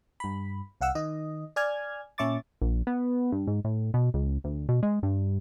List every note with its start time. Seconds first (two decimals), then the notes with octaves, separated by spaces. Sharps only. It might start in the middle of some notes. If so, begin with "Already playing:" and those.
0.20 G2 B5
0.81 C2 F5 F#5 E6
0.95 D#3 D#5
1.56 D5 G#5 F6 G#6
2.18 A#2 C#4 E5 C#6 D6 A6
2.62 A#1
2.87 B3
3.32 G2
3.47 G#2
3.64 A2
3.94 B2
4.14 C#2
4.44 D2
4.69 B2
4.83 G#3
5.03 G2